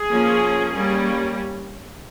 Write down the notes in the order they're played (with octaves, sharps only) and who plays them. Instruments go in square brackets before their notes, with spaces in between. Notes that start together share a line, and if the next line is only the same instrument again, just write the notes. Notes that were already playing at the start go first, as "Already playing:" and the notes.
Already playing: [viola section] G#4
F3 A#3 C#4
G3 A#3 C#4